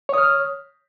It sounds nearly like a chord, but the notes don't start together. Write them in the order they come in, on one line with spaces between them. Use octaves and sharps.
C#5 D#6 F6